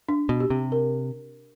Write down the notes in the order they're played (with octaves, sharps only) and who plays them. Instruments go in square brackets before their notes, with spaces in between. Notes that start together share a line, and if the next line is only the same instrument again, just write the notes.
[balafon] D4
[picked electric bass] B2
[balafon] G4
[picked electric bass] C3
[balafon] A#4